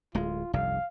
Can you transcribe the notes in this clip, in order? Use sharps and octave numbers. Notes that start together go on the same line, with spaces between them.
D1 G#3 F4
F1 C2 G2 F5